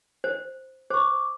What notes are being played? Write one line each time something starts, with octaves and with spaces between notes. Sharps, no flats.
C5
C5 C#6 D6